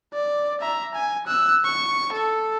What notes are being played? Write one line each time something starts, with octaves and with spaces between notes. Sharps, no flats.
D5
E5 A#5
G#5
E6 F#6
C#6
A4